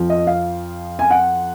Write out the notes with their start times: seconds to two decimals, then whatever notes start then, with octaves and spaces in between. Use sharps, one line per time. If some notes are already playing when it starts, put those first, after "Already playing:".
Already playing: F2 F3
0.10 D#5
0.27 F5
0.99 G#5
1.11 F#5